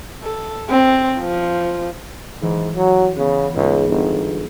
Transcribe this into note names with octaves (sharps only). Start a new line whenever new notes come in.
A4
C4
F3
G#2 E3
F#3
C#3 B3
C#2 G#2
G1